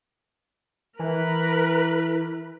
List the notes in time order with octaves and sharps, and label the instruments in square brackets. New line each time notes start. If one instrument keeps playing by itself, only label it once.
[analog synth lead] E3 [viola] A#4 B4